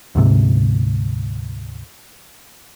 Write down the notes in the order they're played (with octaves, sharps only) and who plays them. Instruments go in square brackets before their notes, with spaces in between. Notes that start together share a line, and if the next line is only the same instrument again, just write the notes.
[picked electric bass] D2 G#2 C3